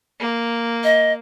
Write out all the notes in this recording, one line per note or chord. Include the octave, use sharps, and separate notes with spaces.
A#3
D#5